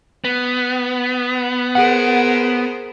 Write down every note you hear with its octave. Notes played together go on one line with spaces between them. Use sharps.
B3
G#4 A#4 C5 F#5